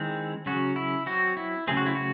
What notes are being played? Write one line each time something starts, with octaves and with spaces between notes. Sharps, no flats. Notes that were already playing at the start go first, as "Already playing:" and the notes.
Already playing: D#3 G#3 C4 E4
C#3 F#3 C#4 F#4
E4
F#3 C4 F#4
E4
C#3 F#3 A3 C4 G#4
F#4
E4
F#4